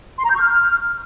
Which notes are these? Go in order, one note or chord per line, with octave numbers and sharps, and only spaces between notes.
C6
A#5
G6
C#6
F6